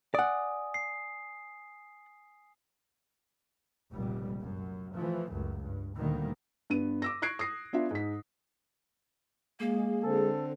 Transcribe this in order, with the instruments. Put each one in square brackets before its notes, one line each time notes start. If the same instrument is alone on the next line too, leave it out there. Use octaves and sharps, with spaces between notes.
[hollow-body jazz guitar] D5 F#5 [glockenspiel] G#5 D#6
[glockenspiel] C7
[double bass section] F1 C#2 A#2 G3
F#2
E3 F3 A3
C#2 F#2
G2
D2 A#2 D3 D#3 G3 A#3
[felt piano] G2 B3 D#7
D6 E6 A#6
C#6 F#6 G#6 C7 D7
D#6 A#6 C7
B3 D4 F4 E5
G#2 B6
[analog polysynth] G#3 G#4 [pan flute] A#3
[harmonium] D3 C4 [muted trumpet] A4